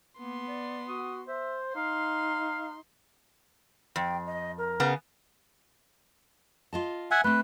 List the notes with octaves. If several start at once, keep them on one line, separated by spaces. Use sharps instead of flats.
A#3 B3 C6
D5
F#4 D#6
C5 E5
D#4 F5 C6
F2 G5
D#5
A#4
C#3 B3
F4 D#5 A5
E5 F#5 G#5
A3 C4 B4